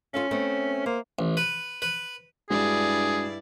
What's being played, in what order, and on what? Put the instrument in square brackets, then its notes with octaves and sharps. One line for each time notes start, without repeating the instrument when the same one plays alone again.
[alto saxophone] C#4 [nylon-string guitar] F4 A4 F5
[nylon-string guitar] A3 B3 C4
[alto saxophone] A#3 [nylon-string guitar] C5
[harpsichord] A1
B4
B4
[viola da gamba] G2 E4 D5 [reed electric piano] G#3 D4 F#4 [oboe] G#4